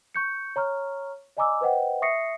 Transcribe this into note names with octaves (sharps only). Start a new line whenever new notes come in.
C#6 G6 C#7
C#5 A#5 C#6 F6
D5 D#5 G#5 A#5 D6 E6
B4 C5 D#5 F#5 G5
E5 C#6 D#6 A#6 C7 C#7